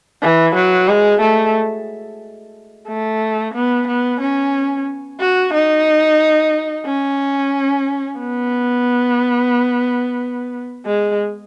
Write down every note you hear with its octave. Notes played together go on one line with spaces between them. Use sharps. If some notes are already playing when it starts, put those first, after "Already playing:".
E3
F#3
G#3
A3
A3
B3
B3
C#4
F#4
D#4
C#4
B3
G#3